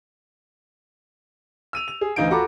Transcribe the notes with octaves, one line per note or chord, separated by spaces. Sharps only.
E6 D#7 F7
F7
G#4
D2 E3 D#4 F5 G6 D7
F4 F#4 A4 A#5 B5 D6